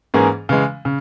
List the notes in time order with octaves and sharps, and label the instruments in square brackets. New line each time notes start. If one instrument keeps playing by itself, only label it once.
[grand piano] G#2 E3 A#3 C#4 G#4
C#3 E3 G#3
C#3